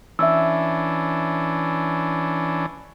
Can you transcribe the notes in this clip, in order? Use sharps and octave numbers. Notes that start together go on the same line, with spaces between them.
E3 C#4 D4 E5 E6